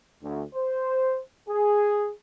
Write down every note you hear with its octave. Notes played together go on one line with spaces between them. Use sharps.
D2
C5
G#4